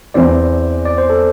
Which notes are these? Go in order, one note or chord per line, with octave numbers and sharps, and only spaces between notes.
E2 E3 C4 D5
D5
C5
A4